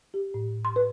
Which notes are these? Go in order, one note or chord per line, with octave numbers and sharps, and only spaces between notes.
G4
A2
C6
B4